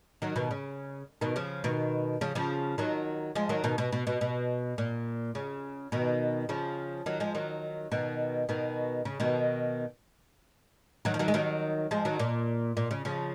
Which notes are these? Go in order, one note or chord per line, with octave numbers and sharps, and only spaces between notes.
D#3 F#3
B2 D#3
C#3
B2 D#3
C#3 F3
B2 D#3
C#3 F3
C#3 F3
D#3 F#3
F3 G#3
D#3 F#3
B2 D#3
B2
B2
B2
B2
A#2
C#3
B2 D#3
C#3 F3
D#3 F#3
F3 G#3
D#3 F#3
B2 D#3
B2 D#3
C#3
B2 D#3
D#3 F#3
F3
D#3 F#3
G#3
D#3 F#3
F3 G#3
D#3 F#3
A#2
A#2
C#3
C#3 F3